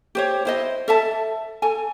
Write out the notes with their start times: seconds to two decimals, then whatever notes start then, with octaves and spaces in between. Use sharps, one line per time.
0.15 G4 C5 C#5
0.45 E4 C5 D#5
0.88 A4 E5 A5
1.62 A4 G#5